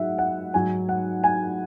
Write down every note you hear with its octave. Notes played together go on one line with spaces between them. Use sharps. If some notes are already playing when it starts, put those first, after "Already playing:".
Already playing: G#2 F#3 E5 F#5
F#5
G#2 F#3 G#5
F#5
G#5